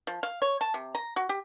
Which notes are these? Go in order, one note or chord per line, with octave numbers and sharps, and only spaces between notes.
F3
F5
C#5
A5
C3
A#5
F#4
G4